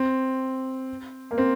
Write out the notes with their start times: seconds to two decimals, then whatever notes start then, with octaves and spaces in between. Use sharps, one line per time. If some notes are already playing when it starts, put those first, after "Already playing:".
Already playing: C4
1.31 A#3
1.38 C4